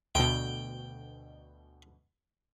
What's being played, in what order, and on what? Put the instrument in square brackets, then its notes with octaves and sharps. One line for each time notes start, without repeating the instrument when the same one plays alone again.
[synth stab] D2 B2 [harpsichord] G5